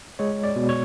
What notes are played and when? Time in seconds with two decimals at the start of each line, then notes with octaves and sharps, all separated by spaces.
0.19 G#3 C#5
0.44 D5
0.56 B2
0.69 C#5